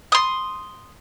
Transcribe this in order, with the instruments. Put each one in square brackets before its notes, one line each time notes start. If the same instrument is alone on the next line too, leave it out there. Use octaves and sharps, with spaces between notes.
[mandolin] C6 D#6